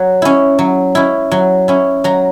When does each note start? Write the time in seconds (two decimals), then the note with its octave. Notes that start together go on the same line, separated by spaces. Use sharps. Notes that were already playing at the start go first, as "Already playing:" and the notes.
Already playing: F#3
0.22 C#4 E4
0.59 F#3
0.95 C#4 E4
1.31 F#3
1.68 C#4 E4
2.04 F#3 A#5